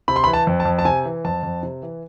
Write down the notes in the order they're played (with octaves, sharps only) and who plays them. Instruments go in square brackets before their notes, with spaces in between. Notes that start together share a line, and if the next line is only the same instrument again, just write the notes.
[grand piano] C3 B5
C6
B5
E3
A5
F2
A5
F2
A5
C3 G#5
E3
F2 A5
F2
C3
E3